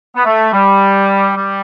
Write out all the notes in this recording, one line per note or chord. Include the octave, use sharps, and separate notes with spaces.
B3
A3
G3
G3